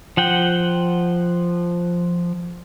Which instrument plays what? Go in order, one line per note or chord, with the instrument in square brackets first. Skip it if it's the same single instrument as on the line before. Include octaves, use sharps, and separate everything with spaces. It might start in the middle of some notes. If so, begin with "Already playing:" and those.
[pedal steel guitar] F3 F#5 G5